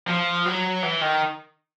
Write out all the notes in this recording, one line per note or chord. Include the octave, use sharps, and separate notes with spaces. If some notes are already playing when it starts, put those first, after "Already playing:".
F3
F#3
E3
D#3